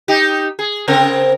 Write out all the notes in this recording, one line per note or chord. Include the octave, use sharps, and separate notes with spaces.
D#4 G4
G#4
C#3 C4 A#4